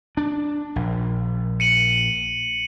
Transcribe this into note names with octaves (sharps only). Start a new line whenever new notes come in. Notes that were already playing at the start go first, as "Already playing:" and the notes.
D4
A#1
C#7 D#7 F#7